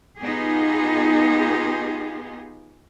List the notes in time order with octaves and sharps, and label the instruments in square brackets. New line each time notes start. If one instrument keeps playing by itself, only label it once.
[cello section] B3 D#4 F4 G4 G#4